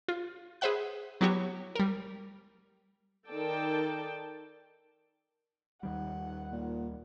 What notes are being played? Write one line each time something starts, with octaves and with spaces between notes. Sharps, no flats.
F4
G#4 B4 C5 E5 F#5 F#6
F#3 B3 E4 F#4 G4 C#5
G3 A#4
D#3 A4 D5 G5 A5
D#2 D#3 G3 F#5
A#2